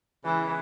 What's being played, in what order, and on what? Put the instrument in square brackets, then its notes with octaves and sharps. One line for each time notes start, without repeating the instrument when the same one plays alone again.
[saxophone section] C#3 G#3 B3 E4 [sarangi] E3